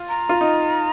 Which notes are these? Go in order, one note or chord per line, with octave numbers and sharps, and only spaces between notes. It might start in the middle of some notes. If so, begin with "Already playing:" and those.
Already playing: F4
A#5
F4
D#4